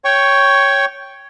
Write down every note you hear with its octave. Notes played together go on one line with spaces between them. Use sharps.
C#5 G5 C#6